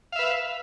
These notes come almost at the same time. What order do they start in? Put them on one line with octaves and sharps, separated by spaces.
F5 E5 B4